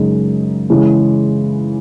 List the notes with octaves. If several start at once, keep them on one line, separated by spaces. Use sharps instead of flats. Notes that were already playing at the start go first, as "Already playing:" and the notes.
Already playing: F#2 C#3 G#3 D#4
C#3 E3 G#3